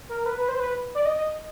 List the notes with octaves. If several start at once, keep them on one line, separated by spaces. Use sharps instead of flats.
A#4
B4
B4
C5
B4
D5
D#5
D#5